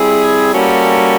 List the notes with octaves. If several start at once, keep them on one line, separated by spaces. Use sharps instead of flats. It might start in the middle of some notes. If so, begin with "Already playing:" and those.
Already playing: G3 C4 E4 G#4
G3 A#3 C#4 F#4 A4